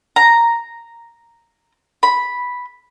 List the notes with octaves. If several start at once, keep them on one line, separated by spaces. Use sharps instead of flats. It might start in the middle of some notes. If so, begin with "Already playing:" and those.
A#5
B5